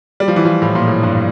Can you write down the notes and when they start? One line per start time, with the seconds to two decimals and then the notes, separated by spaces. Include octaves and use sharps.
0.20 G3
0.28 F3
0.36 E3
0.45 F3
0.62 A2
0.75 A#2
0.87 A2
1.03 G2